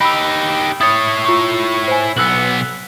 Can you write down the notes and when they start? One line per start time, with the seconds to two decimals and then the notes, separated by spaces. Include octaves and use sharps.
0.01 D#4 G4 B5 E6
0.81 E4 C#5 D#6 A6
1.25 F4 C#6
1.88 C5 G#5
2.17 B1 B3 E6 F#6 F#7